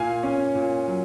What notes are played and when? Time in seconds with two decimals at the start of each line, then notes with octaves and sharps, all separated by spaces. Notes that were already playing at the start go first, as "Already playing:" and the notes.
Already playing: A#2 F5 G#5
0.23 C#4
0.55 A#2
0.88 F#3